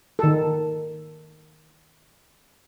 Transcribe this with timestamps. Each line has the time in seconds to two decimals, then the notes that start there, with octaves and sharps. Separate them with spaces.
0.19 D#3 A4